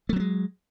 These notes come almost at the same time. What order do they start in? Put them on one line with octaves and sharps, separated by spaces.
A3 F#3 B3 G#3